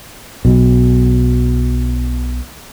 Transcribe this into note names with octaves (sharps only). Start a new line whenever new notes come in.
B1 B2 F#3